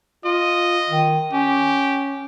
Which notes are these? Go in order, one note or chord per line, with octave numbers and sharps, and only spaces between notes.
F4 D#5
D#3
C#4 G4